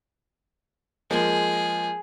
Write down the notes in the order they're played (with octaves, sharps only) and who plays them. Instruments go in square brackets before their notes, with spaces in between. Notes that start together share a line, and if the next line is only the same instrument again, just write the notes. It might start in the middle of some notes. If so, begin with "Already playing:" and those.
[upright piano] F3 G#3 A#3 [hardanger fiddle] G#4